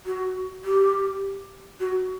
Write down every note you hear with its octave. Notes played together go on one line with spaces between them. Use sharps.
F#4
G4
F#4